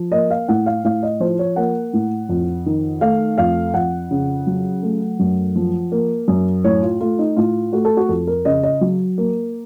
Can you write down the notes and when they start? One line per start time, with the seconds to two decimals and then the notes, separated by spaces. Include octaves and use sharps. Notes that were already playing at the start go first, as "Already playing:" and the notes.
Already playing: F3
0.12 A#3 D#5
0.31 F5
0.48 A2 F#5
0.66 F5
0.84 A2 F5
1.03 D#5
1.20 F3 C5
1.39 C#5
1.56 A#3 F#5
1.93 A2
2.29 F2
2.66 D#3
3.01 A3 F5
3.38 F2 F5
3.74 F2 F#5
4.11 C#3
4.47 F#3
4.83 A3
5.20 F#2
5.56 F3
5.92 A#3
6.28 F#2
6.64 A2 C#5
6.83 F4
7.01 A3 F4
7.19 D#4
7.36 A2 F4
7.73 A3 F#4
7.85 A4
7.97 F#4
8.09 F2 A4
8.27 A#4
8.45 C#3 D#5
8.63 D#5
8.81 F#3
9.18 A#3